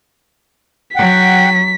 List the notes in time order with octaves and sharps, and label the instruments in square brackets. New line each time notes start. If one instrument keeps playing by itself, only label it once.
[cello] F#3 [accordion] F#5 G5 [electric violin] B6